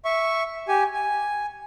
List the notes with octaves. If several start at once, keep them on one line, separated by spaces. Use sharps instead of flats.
E5 C#6
G4 G#5
G#5